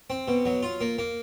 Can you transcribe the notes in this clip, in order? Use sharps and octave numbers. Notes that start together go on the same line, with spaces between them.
C4
B2
F#3
F4
A#3
A#3